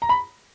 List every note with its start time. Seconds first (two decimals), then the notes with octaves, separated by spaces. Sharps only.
0.02 A#5
0.09 B5